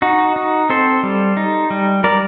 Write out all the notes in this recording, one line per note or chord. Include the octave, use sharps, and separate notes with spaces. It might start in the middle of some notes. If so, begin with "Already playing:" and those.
D#4 F#4
D#4
C4 A4 C5
G3
D#4
G3
G3 A#4 D5